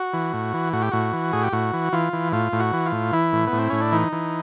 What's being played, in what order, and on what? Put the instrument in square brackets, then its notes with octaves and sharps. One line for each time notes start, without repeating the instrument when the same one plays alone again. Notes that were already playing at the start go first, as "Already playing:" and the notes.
Already playing: [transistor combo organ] F#4
E3
A2
E3
A2 F#4
G4
A2 F#4
E3
A2 G#4
G4
A2 F#4
E3
E3 F4
E3
A2 F4
A2
F#4
E3
F4
A2
E3 E4
A2
B3
A2
C4
A2 C#4
D4
E3 D#4
E3